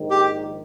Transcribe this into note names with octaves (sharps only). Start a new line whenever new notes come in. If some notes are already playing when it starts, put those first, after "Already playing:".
Already playing: A#1 G#2 D#3 G#3
G4